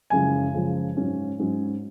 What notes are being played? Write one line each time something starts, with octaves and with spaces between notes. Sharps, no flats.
F#1 F#2 C#3 F3 G#3 G#5
F#1 F#2 C#3 F3 G#3
G#2 F#3 C#4
G#2 F#3 C#4